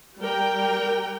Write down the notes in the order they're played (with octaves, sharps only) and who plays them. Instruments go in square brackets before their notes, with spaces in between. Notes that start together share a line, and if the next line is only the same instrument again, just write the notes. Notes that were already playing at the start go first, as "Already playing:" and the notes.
[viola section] G3 A#4 G5